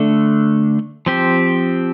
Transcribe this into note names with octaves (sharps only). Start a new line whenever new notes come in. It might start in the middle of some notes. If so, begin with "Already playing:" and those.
Already playing: D3 A3 D4
F3 C4 G4